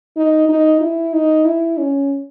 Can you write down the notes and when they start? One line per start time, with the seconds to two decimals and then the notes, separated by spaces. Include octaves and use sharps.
0.17 D#4
0.49 D#4
0.81 E4
1.13 D#4
1.45 E4
1.78 C#4